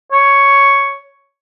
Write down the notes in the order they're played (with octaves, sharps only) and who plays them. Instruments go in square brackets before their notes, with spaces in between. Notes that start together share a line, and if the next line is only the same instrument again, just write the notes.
[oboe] C#5